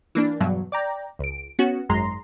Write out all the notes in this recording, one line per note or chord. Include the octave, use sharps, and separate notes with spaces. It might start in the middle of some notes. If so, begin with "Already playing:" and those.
E3 A#3 D4
E2 G2 B2 F#3
D5 G5 A#5
C#2 D7
B3 C#4 F#4
G#1 F#2 G#3 A#5 C6